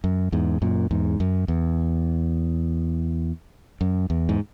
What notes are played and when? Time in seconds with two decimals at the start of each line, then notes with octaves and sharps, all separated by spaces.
0.04 F#2
0.32 E2 G#2
0.62 F#2 A#2
0.91 E2 G#2
1.20 F#2
1.48 E2
3.81 F#2
4.10 E2
4.29 G#2